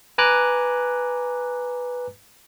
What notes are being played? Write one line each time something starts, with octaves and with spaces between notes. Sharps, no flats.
B4 G#5 A#5 D6 F#6